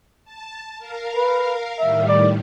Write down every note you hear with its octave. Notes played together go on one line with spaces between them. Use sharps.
A5
A#4 F5
B4
A2 D#3 G3 E5
D5